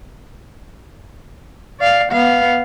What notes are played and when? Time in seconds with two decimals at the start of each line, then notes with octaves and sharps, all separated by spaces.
1.80 D5 F5
2.12 B3 F5